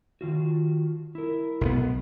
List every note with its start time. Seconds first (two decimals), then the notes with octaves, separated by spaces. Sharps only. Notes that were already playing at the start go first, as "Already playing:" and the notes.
0.21 D#3 F4 F#4
1.15 E4 A#4
1.61 B1 D#3 B3